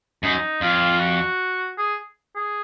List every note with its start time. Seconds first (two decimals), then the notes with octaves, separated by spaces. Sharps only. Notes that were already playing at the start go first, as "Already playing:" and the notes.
0.23 F#2 D#4
0.61 F2 F4
1.00 F#4
1.77 G#4
2.36 G#4